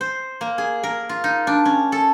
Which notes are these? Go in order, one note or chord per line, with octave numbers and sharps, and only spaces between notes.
C5
A#3
G#4
A#4
F4
D#4
D4
C#4
A4